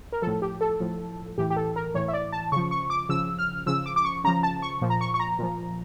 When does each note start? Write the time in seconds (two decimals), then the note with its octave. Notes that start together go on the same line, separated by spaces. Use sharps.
0.12 A#4
0.22 A2 F3 A4
0.42 G4
0.61 A4
0.80 A2 F3
1.38 A2 E3 G4
1.50 G4
1.57 A4
1.76 A#4
1.94 A2 E3 C#5
2.08 E5
2.13 D5
2.32 A5
2.52 C#3 F3 C#6
2.71 C#6
2.90 D6
3.09 C#3 F3 E6
3.39 F6
3.66 C#3 F3 E6
3.86 D6
3.96 D6
4.05 C#6
4.24 C#3 F3 A#5
4.43 A5
4.62 C#6
4.82 A#2 F3
4.90 A#5
5.01 C#6
5.14 C#6
5.20 A#5
5.39 A#2 F3